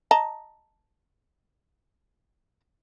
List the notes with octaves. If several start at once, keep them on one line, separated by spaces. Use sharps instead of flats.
D#5 A5 A#5